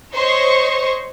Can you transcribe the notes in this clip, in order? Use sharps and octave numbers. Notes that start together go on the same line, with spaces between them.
C5 C#5 D#5 C#6